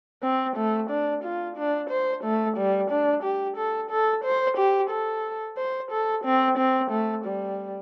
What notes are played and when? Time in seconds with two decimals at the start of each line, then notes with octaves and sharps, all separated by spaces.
0.23 C4
0.56 A3
0.90 D4
1.24 F4
1.57 D4
1.90 C5
2.24 A3
2.57 G3
2.91 D4
3.23 G4
3.57 A4
3.90 A4
4.24 C5
4.57 G4
4.90 A4
5.57 C5
5.91 A4
6.25 C4
6.58 C4
6.91 A3
7.25 G3